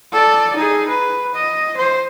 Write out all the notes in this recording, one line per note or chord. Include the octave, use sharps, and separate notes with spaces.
A4 D5
D#4 G#4
B4
D#5
C5